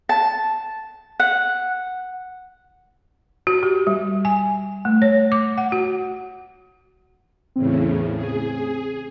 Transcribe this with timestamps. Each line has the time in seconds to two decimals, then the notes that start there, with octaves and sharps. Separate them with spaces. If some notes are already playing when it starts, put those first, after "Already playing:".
0.09 A5
1.20 F#5
3.47 F#4
3.63 G4
3.87 G3
4.25 G#5
4.85 A3
5.02 C#5
5.32 D6
5.58 F#5
5.72 F#4
7.56 E2 A2 C#3 C4
8.15 G#4